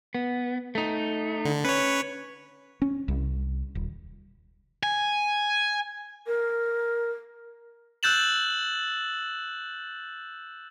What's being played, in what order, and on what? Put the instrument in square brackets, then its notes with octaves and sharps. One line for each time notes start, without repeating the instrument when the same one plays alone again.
[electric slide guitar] B3
A3 D#4
[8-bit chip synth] D3
[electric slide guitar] C#4 [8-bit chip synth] B4 C#5
[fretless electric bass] C#4
C2
D#1
[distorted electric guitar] G#5
[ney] A#4
[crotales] E6 F#6 G6 A6 E7 F#7